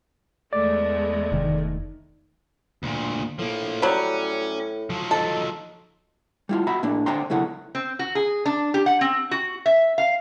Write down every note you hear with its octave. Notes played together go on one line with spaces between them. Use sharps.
E2 G#3 A3 D5
F1 D#3
D2 A#2
A2 F3 A#3
F#3 G3 C#4
F3 F#3
D#4 A4
G3 E4 F4
F#4 E5 A#5 B5
A2 A#3 D4
D3 D4 C5 G5 A#5 C6
B1 C#3 F#3 E4 A4 F#5
C4
F#4
G#4
D4
G4
F#5
C4
F#4
E5
F5